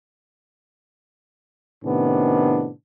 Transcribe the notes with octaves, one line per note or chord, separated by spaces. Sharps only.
A2 C3 D#3 B3 C#4 D4